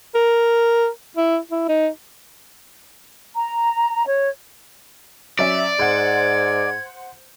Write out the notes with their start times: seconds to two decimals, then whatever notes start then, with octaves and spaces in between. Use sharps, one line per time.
0.15 A#4
1.17 E4
1.51 E4
1.68 D#4
3.35 A#5
4.06 C#5
5.39 F#3 C#4 D5 E5
5.79 G#2 C5 F#5 G#6